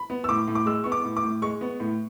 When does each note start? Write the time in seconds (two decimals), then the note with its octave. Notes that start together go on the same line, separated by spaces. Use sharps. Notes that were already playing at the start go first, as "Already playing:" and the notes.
Already playing: B5
0.10 B3
0.24 E6
0.29 A2 D6
0.48 A2
0.55 D6
0.66 G#3 E6
0.84 B3 C#6
0.92 D6
1.05 A2
1.17 D6
1.23 A2
1.42 G#3 C#6
1.61 B3
1.80 A2